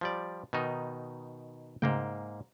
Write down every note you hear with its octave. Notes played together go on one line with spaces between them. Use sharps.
F3 G3 D5
B2 D#3 D#4
G#2 C#3 A3 A#3 G5